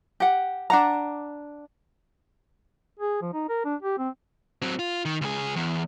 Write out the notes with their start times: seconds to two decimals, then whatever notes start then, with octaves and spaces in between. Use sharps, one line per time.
0.20 G4 F#5
0.70 D4 F#5 A#5
2.99 G#4
3.22 F3
3.33 D#4
3.49 A#4
3.65 D4
3.82 G4
3.98 C4
4.62 F#3 C4
4.79 F4
5.05 D#3
5.21 C#2 G#4
5.56 E2